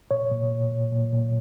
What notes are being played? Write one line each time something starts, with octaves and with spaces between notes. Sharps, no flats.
A#2 C#5
A#2
A#2
A#2
A#2
A#2